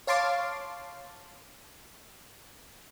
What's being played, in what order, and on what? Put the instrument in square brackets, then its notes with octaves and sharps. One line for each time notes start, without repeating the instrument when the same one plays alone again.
[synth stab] C#5 F5 A5 C6 D6